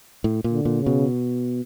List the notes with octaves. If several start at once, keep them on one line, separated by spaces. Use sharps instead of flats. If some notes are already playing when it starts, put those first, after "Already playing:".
A2
A#2
D3
A#2
C#3
B2